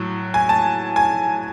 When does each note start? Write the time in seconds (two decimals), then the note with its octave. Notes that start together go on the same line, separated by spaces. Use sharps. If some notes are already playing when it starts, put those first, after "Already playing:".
Already playing: A2 F#3
0.34 G#5
0.49 A5
0.96 G#5